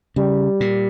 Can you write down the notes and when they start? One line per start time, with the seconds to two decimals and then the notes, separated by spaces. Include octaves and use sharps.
0.16 C#3 G3
0.60 A#2